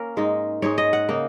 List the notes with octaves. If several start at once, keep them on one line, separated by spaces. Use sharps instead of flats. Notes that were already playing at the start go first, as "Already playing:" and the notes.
Already playing: A#3 C#4 A#4
G#2 G#3 D#4
G#2 G#3 D#4 C#5
D#5
F#5
C#3 A#3 D#4